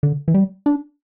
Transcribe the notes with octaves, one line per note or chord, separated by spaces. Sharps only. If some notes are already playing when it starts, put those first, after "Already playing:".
D3
E3
G3
D4